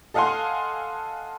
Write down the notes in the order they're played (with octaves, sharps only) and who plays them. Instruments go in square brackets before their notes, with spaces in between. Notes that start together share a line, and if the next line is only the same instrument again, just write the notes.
[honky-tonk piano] A4 D#5 F5 F#5 G#5 C6